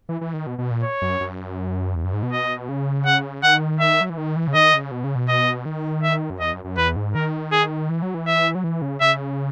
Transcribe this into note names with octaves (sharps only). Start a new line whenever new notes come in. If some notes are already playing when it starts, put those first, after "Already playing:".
E3
E3
D#3
B2
B2
A#2
C#5
F#2
F#2
E2
F#2
G#2
B2
D#5
C#3
F#5
D#3 F#5
E5
F#3
E3
D#3
E3
C#3
D#3 D#5
C#3
B2
C#3
B2
D#5
D#3
E5
F#2
E2 D#5
F#2
F#2
E2 B4
G#2
D#3 A#4
G#4
E3
F#3
E3
E5
F#3
E3
C#3
C#3 E5